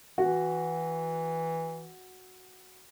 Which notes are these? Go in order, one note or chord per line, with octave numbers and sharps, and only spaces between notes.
E3 F#4